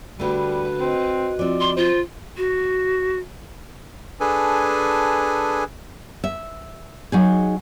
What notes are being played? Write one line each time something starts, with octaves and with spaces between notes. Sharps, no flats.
D3 G3 A3 F#4 B4 B5
C4 F#4 D#5
F3 C4 D5
C6
F4 C5
F#4
D4 G#4 A4 B4 G#5
E5
F#3 D#4 G#4